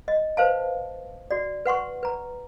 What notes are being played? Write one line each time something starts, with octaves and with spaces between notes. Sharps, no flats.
D#5
B4 C5 F5 A5
F#4 D5
B4 F#5 C6 C#6
B4 A#5